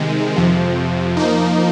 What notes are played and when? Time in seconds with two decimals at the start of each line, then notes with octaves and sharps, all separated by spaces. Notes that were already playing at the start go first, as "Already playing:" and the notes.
Already playing: C3 D#3 G#3
0.36 F2 C3 F3
1.17 F3 A#3 D#4